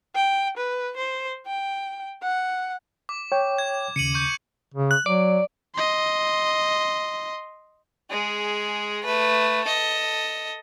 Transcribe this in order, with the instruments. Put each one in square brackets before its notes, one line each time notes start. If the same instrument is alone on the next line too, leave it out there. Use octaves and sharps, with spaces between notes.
[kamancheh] G5
B4
C5
G5
F#5
[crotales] D6
[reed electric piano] C#5 G5
[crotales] G#6
[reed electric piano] D#2 C#3 [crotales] C#7 D#7 F#7
[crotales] C#6 G6
[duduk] C#3
[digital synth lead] F#6
[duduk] F#3 [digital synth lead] D5
[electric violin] D#5 C6
[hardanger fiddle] G#3 G#4
A3 B4
A4 D#5